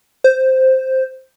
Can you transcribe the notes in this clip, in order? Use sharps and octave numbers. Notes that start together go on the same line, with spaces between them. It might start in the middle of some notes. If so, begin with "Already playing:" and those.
C5